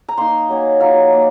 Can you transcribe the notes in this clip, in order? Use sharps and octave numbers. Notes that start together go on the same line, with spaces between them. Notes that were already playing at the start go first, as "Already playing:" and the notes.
A#5
A#3 D#4 C6
F#3 A#3 C#4
F#3 A#3 F4 F5
A#3